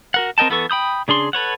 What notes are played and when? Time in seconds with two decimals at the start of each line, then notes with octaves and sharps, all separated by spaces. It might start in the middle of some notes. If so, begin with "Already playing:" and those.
0.14 F#4 A#4 F#5
0.38 C4 A#4 D#5 G5 A5
0.49 E3 B3 A4 C#6
0.70 G5 B5 D#6 G6
1.08 C#3 D4 G#4 C6
1.33 A4 B4 C#5 F#5